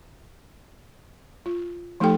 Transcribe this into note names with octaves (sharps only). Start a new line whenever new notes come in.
F4
F3 A3 D#4 G4 A4 G5